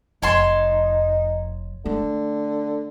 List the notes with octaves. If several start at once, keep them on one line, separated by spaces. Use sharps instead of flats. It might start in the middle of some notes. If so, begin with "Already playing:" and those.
F1 F2 D#4 C#5 A5 C6
D3 A3